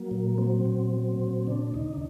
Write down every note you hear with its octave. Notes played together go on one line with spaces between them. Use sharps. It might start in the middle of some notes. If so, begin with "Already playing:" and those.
Already playing: F#3 A#3
A#2
F#3 C4
A#2
F#3
A#2
C#3 D4
D#2 D#4
D4